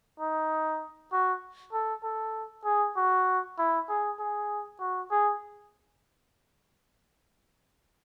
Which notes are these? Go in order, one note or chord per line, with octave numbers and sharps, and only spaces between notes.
D#4
F#4
A4
A4
G#4
F#4
E4
G#4
G#4
F#4
G#4